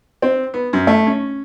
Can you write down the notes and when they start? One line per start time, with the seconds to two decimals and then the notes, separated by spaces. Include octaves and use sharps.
0.22 C4
0.54 B3
0.73 F#2
0.87 A3
1.07 C#4